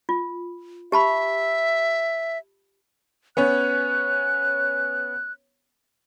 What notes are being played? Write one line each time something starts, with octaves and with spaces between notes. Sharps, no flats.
F4
G4 E5 A5 B5
B3 C#4 C#5 F#6